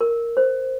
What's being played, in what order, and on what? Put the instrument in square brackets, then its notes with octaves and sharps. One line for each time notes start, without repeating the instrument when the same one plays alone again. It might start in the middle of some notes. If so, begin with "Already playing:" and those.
[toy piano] A#4
C5